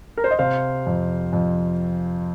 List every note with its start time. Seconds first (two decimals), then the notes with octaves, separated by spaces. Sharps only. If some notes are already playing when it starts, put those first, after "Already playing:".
0.17 A#4
0.24 C5
0.31 D#5
0.39 C3 C5 F5
0.86 F2
1.33 F2